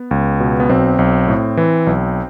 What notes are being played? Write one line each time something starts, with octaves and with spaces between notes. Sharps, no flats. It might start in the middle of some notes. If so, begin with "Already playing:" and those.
Already playing: B3
C#2
B2
B3
B1 C4
B1
A2
E3
B1